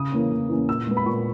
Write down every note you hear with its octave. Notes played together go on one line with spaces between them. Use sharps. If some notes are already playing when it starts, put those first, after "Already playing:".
Already playing: C#3 D#6
E3 A#3 C#4
C#3
E3 A#3 C#4
A#2 E6
G#3 B3
B5
A#2 C#6